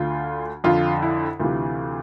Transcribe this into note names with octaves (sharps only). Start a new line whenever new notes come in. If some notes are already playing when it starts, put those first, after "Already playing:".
Already playing: D2 D3 F4
F2 D3 F4
E4
D2 C3 E3 F4